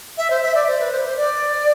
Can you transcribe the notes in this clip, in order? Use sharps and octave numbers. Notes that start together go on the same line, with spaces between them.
E5
C5
E5
D5
C5
B4
C5
C5
D5